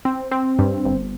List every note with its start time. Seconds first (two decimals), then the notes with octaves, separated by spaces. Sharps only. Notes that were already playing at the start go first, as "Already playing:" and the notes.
0.05 C4
0.31 C4
0.59 G2
0.85 G1